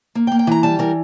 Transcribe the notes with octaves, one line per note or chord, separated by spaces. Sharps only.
A#3
G5
A#3
G5
E3 A#5
G3 A5
E3 A#4